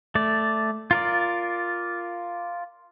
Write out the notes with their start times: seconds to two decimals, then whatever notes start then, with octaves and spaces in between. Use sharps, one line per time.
0.15 A3 D5
0.91 F4 A#4 D5